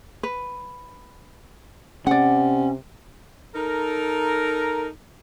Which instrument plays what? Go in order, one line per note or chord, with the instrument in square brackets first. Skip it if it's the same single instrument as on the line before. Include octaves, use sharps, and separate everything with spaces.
[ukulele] B4
[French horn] C3 [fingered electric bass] C#4 [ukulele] D5 F#5
[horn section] D#4 A4 A#4